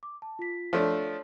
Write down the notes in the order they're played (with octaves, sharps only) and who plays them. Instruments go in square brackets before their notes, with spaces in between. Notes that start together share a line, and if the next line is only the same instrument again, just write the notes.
[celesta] D6
A5
F4 B6
[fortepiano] F3 A3 D4 [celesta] C#5